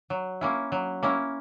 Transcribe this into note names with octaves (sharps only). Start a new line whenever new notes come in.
F#3
A#3 C#4 E4
F#3
A#3 C#4 E4